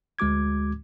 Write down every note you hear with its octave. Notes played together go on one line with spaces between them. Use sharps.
D2 G#3 F#4 D6 G#6